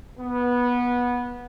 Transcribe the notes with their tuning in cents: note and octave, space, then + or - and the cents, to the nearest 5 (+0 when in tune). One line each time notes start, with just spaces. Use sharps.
B3 -15